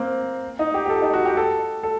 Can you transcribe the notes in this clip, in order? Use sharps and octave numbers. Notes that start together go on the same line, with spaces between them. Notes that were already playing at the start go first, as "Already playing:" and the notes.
Already playing: A#3 C4
D#4
G4
G4
A4
D#4
F#4
G4
A4
A4